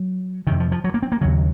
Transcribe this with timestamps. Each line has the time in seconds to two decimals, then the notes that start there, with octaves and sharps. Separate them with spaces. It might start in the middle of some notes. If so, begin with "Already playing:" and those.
Already playing: F#3
0.47 F2 C3 D#3
0.60 F3
0.72 F3
0.84 F#3
0.94 A#3
1.03 C4
1.12 A#3
1.21 D#2 C#3 F#3